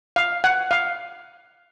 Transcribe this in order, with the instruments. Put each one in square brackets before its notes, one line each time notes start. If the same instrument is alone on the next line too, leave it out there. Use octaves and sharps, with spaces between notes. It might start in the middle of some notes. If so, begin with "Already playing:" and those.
[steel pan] F5
F#5
F5